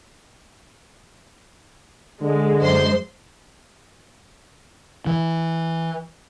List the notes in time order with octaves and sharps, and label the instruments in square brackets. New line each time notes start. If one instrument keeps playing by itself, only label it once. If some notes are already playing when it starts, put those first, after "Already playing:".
[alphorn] D3 [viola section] G#3
[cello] F#2 [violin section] C5 C6
[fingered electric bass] E3